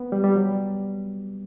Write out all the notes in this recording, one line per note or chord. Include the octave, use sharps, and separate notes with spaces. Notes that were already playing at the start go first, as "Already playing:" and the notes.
Already playing: B3
G3
G3
F#3